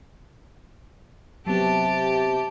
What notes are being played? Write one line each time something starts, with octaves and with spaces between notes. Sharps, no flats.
C3 F#3 B3 G4 A5